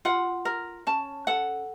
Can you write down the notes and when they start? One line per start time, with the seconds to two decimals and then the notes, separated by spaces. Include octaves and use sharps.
0.05 F4 F#5
0.45 A#4
0.87 C#4 A5
1.27 A4 F#5